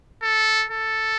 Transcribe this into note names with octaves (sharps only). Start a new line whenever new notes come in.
A4
A4